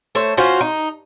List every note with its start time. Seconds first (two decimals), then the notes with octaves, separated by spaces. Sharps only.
0.15 A3 C5 C#5
0.37 C#4 F4 F#4 C5
0.61 D#4